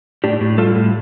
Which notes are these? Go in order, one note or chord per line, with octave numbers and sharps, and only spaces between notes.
A2 D4 G4
A2
G3 F4 A4
A2